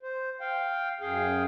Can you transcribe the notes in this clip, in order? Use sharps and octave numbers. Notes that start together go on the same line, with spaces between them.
C5
F5 G5
F#2 G#4 F5 G5